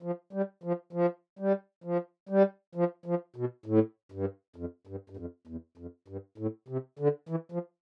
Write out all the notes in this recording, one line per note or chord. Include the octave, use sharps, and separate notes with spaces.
F3
G3
F3
F3
G3
F3
G3
F3
F3
B2
A2
G2
F2
G2
G2
F2
E2
F2
G2
A2
C3
D3
E3
F3